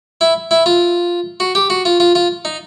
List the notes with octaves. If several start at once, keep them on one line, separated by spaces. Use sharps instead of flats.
E4
E4
F4
F#4
G4
F#4
F4
F4
F4
D#4